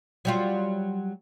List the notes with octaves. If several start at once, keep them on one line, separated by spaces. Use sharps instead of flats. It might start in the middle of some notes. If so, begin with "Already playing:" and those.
F#3 G3 F4